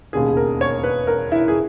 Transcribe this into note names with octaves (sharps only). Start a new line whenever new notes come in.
E1 D#2 C#3 G#4
A#4
C#5
B4
A#4
E4
G#4